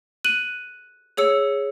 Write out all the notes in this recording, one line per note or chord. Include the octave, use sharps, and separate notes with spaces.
F#6 D#7 F#7
G#4 C#5 E6 C#7